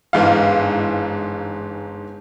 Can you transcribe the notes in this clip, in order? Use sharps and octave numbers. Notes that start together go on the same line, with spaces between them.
G1 G#2 E3 F5